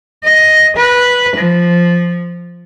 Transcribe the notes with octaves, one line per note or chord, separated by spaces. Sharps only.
D#5
B4
F3